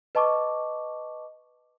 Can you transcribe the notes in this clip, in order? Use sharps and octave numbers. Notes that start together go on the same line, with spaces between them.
B4 D#5 A5 C#6 D6